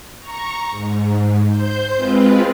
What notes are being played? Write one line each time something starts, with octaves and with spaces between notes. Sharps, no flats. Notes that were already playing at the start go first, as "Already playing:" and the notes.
A#5 C#6
G#2
C5 G6
G#3 C4 F4 B4